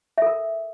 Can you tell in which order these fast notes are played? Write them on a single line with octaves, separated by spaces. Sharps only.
E5 A4 A#4